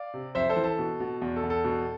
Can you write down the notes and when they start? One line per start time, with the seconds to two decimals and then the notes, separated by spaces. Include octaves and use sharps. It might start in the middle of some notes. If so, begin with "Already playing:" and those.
Already playing: D5 F5
0.14 C3
0.35 F2 C5 E5
0.49 A4 C5
0.56 E3
0.63 A4
0.78 B2
1.00 B2
1.22 E2
1.36 A4
1.44 E2
1.50 A4
1.64 B2